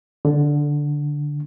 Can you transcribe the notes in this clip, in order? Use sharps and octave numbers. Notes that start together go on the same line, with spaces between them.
D3